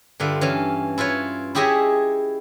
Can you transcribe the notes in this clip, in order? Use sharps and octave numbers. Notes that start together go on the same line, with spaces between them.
G2 D3 F4 E5
E3 C#4 F5
E4 F4 B4 C#5
E4 G4 G#4 C#5 D#5 E5